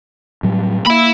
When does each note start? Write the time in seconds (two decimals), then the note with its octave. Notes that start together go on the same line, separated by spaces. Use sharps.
0.43 A2 F#3 G3
0.87 A#3 E5 B5